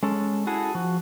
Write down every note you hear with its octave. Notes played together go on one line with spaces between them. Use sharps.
G#3 C#4 A4
E4 F#4 G#4 A4
F3 F#4